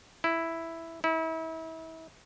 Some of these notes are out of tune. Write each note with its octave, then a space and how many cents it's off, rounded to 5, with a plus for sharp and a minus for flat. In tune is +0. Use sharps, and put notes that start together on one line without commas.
E4 +0
E4 -35